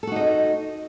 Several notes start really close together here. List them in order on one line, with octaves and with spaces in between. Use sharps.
A4 F#4 D#4 D#5